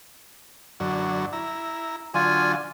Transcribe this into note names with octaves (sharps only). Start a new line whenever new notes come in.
F#2 D3 F#3
E4 A#5
D3 F#3 F4 G#5